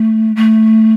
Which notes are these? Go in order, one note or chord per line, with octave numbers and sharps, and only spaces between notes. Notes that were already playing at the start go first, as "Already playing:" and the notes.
Already playing: A3
A3